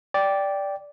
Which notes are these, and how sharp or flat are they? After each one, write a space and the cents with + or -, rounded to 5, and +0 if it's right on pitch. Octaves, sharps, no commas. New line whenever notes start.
D5 -10 G5 +0